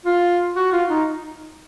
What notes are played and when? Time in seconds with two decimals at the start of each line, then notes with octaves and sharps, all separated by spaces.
0.05 F4
0.56 F#4
0.72 F4
0.89 D#4